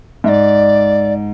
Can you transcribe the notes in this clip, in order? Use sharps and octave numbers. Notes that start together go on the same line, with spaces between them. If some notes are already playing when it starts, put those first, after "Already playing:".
G#2 D5 E5